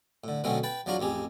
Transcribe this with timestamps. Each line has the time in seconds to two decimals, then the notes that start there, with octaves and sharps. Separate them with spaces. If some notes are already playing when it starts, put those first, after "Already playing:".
0.24 A2 D3
0.44 B2 D3 F#3 A3 C4 C#4
0.63 B4 G5 A5
0.86 E2 F#3 D4 F4 F#4 A#5
1.00 A1 F2 G4 G#4